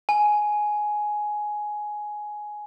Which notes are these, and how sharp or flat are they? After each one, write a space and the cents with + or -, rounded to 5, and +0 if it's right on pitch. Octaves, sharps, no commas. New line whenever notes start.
G#5 +10